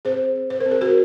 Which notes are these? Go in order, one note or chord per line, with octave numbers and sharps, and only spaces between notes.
C4 G#4 C5
C4
C5
A#4
C4
G#4
F#4 A#4